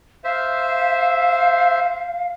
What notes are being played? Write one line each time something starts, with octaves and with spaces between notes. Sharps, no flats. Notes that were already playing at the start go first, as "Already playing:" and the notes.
C5 E5 F5